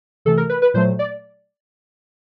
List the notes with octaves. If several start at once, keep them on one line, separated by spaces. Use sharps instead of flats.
C3 E3 A3 A4
A#4
B4
B4
A#2 F#3 A3 C5
D5